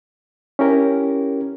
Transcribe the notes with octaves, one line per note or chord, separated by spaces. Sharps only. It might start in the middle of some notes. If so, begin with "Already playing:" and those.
C#4 E4 G4 A#4